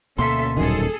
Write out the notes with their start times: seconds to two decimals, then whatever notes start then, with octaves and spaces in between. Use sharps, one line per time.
0.18 D2 B2 A#3 C#4 A4 E5 C6
0.57 D#1 F#2 D#3 G#4 A4